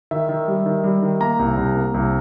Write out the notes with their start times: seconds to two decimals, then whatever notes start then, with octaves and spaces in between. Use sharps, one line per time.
0.11 D#3 E5
0.29 D#3
0.48 G3
0.66 D#3
0.84 G3
1.03 D#3
1.21 A#3 A#5
1.39 C2
1.57 C2
1.75 A#3
1.94 C2